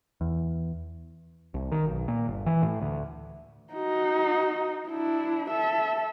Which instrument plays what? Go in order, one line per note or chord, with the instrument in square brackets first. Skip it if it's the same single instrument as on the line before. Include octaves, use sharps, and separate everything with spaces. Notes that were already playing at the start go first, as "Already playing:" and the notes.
[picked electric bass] E2
C2
D#3
B1
A#2
G1
E3
A2
D2
[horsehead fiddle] D#4 F#4
D4 E4
A4 E5